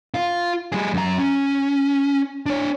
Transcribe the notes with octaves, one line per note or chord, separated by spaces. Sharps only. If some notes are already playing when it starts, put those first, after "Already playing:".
F4
G3 G#4
F#2 A#5
C#4
D4 C#5